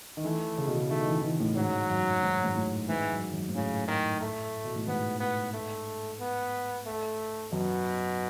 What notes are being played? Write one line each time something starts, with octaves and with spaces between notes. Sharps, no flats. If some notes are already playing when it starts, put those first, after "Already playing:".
D#3
E3 A3
C#3
B2
C#3
D#3 A3
E3
E3
A2
G#2 F#3
F#2
G#2
G#2
A2
G#2 E3
F#2
F#2
G#2
A2 C#3
D#3
A3
B2
A2
G#2 B3
B3
A3
B3
A3
F#2 B2